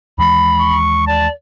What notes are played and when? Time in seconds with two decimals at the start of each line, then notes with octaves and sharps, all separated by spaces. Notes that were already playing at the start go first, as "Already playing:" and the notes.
0.18 D#2 E3 G#3 B5
0.60 C#6
1.07 D5 A5